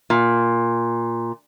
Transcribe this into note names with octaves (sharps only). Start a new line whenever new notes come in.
A#2